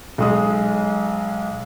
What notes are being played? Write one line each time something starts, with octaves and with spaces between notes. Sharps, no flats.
B1 G#3 D#6